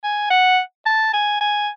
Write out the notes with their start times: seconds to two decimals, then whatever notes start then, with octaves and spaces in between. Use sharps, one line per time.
0.04 G#5
0.30 F#5
0.86 A5
1.14 G#5
1.41 G#5